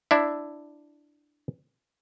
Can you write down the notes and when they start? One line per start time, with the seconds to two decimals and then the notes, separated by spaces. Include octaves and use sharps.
0.11 D4 E4 E5